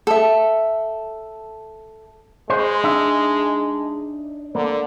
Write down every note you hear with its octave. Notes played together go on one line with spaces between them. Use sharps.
A4 E5
G#3 B4 C5
D4 D#4 E5
D3 A#3